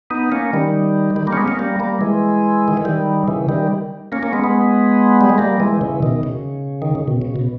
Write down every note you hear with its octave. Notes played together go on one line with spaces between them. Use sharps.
B3 D#4
A#3 C#4
D#3 G3
D#3 G3
G3 A#3
C#4
G#3 B3
A#3 C#4
G3 A#3
G3 A#3
E3 G#3
D#3
E3
D#3 G3
C#3 E3
D#3 G3
A#3 C#4
A#3 C#4
G#3 B3
G#3 B3
G3
G#3
G3 A#3
E3 G#3
C#3 E3
B2 D#3
C#3
D#3
C#3
B2
C#3
B2